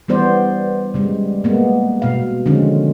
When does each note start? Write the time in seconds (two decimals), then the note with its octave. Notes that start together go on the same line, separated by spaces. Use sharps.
0.08 E3 G3 B3 C5 D5
0.94 C#3 G3 G#3
1.44 G#3 A#3 B3
2.02 B2 F5
2.46 D3 D#3 F3 G#3 C4 C#4